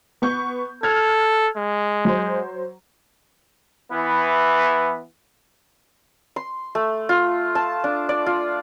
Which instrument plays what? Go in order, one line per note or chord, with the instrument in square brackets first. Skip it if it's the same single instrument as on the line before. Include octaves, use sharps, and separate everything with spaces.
[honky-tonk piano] B3 C#6 G6
[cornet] A4 [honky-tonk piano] F6 G#6
[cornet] G#3
[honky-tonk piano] F#3 C5
[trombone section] E3 B3 E4
[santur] C6
A3
F4
A5
D4
D5
F4